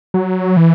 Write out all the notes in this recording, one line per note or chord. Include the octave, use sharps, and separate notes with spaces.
F#3
E3